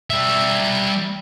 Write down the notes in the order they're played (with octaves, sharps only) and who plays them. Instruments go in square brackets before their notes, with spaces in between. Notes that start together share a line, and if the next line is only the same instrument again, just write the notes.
[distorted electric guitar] G3 E5